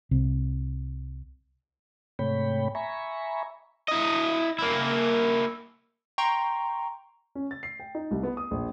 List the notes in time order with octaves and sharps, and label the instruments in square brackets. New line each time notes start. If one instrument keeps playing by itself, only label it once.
[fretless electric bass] C2 C3
[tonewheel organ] G#2 C3 A3 C#5 G5 B5
E5 G#5 A#5 B5 C#6
[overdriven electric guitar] E4 D#5
A#3 E4
[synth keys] G5 A#5 C6 C#6
[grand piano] C#4
A6
C7
G5
D#4
C2
B3
D#6
A#1